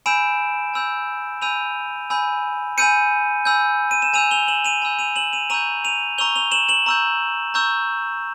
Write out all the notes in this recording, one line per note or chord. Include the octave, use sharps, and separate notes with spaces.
G#5 B5 E6 G6 D7 E7
G#5 B5 E6 G6
G#5 B5 E6 G6 D#7 F7
G#5 B5 E6 G6
G#5 B5 E6 G6 C#7 D#7
G#5 B5 E6 G6
D#7
E7
G#5 B5 E6 G6 D#7 F7
F7 G7
E7 F#7
D#7 F7
G#5 B5 E6 G6
D#7 F7
E7 F#7
D#7 F7
A#5 C#6 E6 G6 D#7 F7
D#7 F7
A#5 C#6 E6 G6 F7 G7
F7 G7
E7 F#7
E7 F#7
A#5 C#6 E6 G6
A#5 C#6 E6 G6